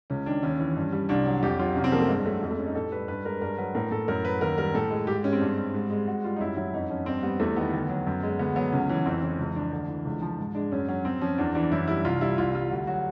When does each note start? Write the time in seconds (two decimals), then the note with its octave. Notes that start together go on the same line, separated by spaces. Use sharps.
0.10 C#2 C#4
0.26 D#3 D4
0.43 D#2 C#4
0.59 E3
0.76 G2
0.92 G3
1.09 C2 D4
1.26 F#3
1.43 F2 G4
1.59 F#3 F4
1.75 C2 C#4
1.84 C4
1.92 F3 A#3
2.01 A3
2.09 G2 G#3
2.26 F#3 A3
2.42 F2 G#3
2.51 A3
2.59 G3 C#4
2.67 D#4
2.75 A2 A4
2.92 G3 B4
3.08 G2 B4
3.25 G#3 A#4
3.41 G2 A#4
3.58 F#3 B4
3.75 A2 A#4
3.91 A2 A4
4.08 F#2 A#4
4.25 F#3 B4
4.41 D#2 A#4
4.58 G3 A#4
4.74 A2 A4
4.91 G#3
5.07 G#2 G4
5.24 G#3 C#4
5.33 C4
5.41 G2
5.58 G3
5.74 G#2
5.90 G#3
6.07 G#2 F#4
6.24 G3 F4
6.36 D#4
6.40 F#2 E4
6.57 F#3 E4
6.73 F2 D#4
6.90 F3 C#4
7.06 G2 C4
7.23 G3 B3
7.40 E2 A3
7.56 D#3 B3
7.73 D2
7.90 F#3
8.07 F#2
8.23 G#3
8.39 D2 B3
8.56 F#3 B3
8.73 C#2 C#4
8.89 E3 C#4
9.06 F2 C4
9.22 E3 C#4
9.39 C#2
9.56 F3 D4
9.73 D2
9.89 E3
10.05 C#2
10.22 F3
10.38 G#2
10.55 G#3 D4
10.72 F#2 C#4
10.89 F#3 C#4
11.05 F#2 C4
11.21 F3 C#4
11.38 E2 D4
11.55 E3 D4
11.71 F#2 E4
11.88 G3 E4
12.05 C2 F4
12.21 G3 E4
12.38 C2 F4
12.54 G3 F4
12.71 D2 F#4
12.87 F#3 F#4